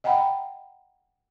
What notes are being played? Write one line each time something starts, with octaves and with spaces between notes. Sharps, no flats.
D#5 F#5 G5 A#5 B5